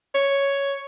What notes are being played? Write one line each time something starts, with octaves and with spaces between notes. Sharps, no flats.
C#5